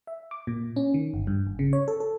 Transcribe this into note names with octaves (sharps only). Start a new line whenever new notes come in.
E5
D6
A#2
C#4
D#3
G1
G2
G#1
C#3
C#5
A4
A4